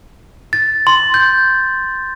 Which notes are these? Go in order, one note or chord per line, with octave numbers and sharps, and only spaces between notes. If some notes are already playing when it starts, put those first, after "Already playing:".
A6
C6
G6